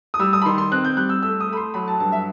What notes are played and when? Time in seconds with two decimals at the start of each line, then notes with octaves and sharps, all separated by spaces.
0.14 D#6
0.19 G3 E6
0.33 D#6
0.42 B5
0.46 D#3 C6
0.58 C6
0.72 C4 F#6
0.85 G6
0.97 G3 F#6
1.09 E6
1.23 A3 E6
1.40 D#6
1.48 A3 B5
1.57 C6
1.74 F#3 B5
1.88 A5
2.00 G2 A5
2.12 E5